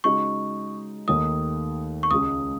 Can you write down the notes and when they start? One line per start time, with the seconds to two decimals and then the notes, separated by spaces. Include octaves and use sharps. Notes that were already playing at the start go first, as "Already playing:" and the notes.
0.04 C#3 G#3 D#4 F#4 C#6
1.08 D#2 D#3 A3 D#4 D#6
2.03 C#6
2.11 C#2 C#3 G#3 D#6